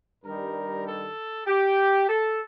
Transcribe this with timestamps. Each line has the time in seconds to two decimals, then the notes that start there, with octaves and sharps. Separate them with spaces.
0.24 G2 D#3 G3 A#4
0.86 A4
1.47 G4
2.08 A4